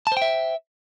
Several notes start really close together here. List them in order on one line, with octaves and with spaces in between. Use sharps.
A5 C5 G5 E5